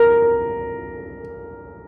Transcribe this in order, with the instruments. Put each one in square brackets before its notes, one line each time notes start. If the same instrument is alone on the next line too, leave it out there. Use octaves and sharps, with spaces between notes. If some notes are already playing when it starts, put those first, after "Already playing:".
Already playing: [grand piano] A#4